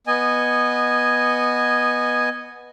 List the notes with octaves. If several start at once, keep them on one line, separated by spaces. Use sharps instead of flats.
B3 D#5 G#5